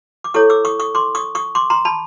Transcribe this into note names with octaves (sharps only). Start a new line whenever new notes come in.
D6
E4 A4 C#5 C#6 D#6
D6 E6
C#6 D#6
C#6 D#6
C6 D6
C#6 D#6
C#6 D#6
C6 D6
A#5 C6
A5 B5